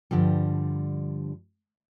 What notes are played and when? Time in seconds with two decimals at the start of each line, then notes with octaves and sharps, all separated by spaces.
0.11 G2 D3 F3 G3